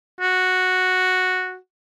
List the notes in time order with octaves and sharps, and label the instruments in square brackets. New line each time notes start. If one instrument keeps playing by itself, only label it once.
[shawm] F#4